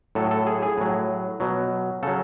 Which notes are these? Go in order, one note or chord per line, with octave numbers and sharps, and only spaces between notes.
A2 F#3 A4
A4
G#4
G#4
A2 F#3
B2 F#3
C#3 F#3 A4